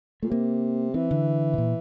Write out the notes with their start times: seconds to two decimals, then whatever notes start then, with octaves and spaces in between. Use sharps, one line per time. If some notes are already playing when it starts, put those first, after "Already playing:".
0.23 A#2 A3
0.31 C3 A#3
0.94 E3 C4
1.11 D3
1.54 C3
1.58 A#2